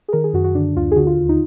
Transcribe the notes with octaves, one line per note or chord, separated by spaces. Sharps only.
G#4
D#3 A#4
G#4
F#2 F#4
F#4
D3 D4
D2 F4
G#4
D3 F#4
F4
D#2
D#4